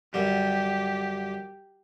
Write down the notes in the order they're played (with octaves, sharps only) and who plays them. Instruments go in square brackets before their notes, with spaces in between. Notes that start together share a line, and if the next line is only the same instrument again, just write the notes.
[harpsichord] F#2 D3 G3 [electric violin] G4